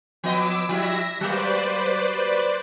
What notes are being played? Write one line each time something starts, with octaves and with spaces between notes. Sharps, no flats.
F3 B3 D#5 D6 E6
F3 G3 E4 E5 A#6
F#3 A#3 B4 C5 D5